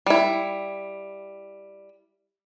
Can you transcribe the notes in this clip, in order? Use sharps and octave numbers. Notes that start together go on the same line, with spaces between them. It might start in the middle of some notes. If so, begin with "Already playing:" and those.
G3 E4